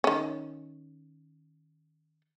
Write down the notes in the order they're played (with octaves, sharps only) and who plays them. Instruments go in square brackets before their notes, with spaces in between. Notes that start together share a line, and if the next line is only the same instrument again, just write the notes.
[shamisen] D#3 C#4